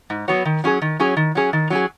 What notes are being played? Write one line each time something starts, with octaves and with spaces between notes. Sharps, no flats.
G#2
F#3 B3 F#4 C#5
D#3
F#3 C#4 G#4
D#3
F#3 C#4 G#4
D#3
F#3 C#4 G#4
D#3
F#3 C#4 G#4